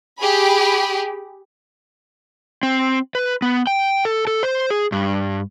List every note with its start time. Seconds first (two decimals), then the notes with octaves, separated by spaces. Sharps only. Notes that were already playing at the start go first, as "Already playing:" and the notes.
0.18 G4 G#4 B5
2.63 C4
3.15 B4
3.42 B3
3.67 G5
4.05 A4
4.27 A4
4.43 C5
4.70 G#4
4.92 G2